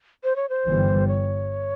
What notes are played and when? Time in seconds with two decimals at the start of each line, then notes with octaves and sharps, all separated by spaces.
0.24 C5
0.36 C#5
0.49 C5
0.65 G1 G2 E3 G3
1.08 C#5